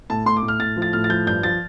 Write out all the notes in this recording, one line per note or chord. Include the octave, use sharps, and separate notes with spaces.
A2 A5
A2 C6
D6
A2
F6
A2 A6
F3
A6
A2 F6
A6
F3 G6
G2 G6
F3 A6